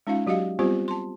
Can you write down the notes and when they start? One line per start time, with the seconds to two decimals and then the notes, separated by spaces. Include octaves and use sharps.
0.07 G#3 C#4 D#4 F4 F5
0.27 F#3 F#4 G4 D#5 F5
0.59 G3 B3 C4 F4 G4 C5
0.88 A5 C6